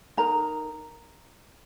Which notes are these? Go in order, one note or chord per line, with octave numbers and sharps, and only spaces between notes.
D#4 A#4 A#5